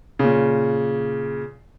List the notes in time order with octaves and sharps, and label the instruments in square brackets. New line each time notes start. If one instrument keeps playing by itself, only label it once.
[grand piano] A#2 C#3